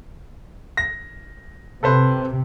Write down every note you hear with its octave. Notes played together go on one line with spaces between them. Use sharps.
A#6
C3 A4 B4 C5